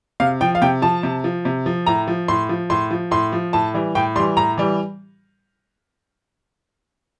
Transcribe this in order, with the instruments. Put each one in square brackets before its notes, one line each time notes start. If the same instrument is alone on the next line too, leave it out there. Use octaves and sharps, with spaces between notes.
[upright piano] C3 F5
F3 G5
F5
C3 G5
F3 A5
C3
F3
C3
F3
A2 A#5
F3
A2 C6
F3
A2 C6
F3
A2 C6
F3
A2 A5
E3 G3
A2 G5
G3 C6
E3
A2 A#5
E3 G3